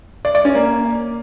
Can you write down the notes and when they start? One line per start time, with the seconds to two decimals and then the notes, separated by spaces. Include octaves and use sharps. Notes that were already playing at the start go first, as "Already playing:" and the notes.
0.25 D5
0.35 D5
0.45 C#4
0.55 A#3